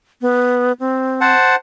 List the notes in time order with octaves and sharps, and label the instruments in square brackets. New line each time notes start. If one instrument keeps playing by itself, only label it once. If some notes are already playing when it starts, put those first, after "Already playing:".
[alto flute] B3
C4
[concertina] C5 F#5 A5